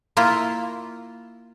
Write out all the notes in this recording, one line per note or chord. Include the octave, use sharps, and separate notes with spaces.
A#3 E4 F4